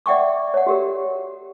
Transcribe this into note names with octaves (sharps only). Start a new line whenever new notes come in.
D5 E5 F#5 G5 C#6 D6
C#5 F#5
F#4 G4 A#4